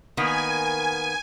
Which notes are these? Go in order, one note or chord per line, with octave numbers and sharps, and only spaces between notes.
D#3 A#3 B3 G#5